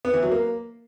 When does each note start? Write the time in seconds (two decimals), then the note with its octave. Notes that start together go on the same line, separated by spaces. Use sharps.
0.05 B3
0.14 E3
0.23 F#3
0.31 A#3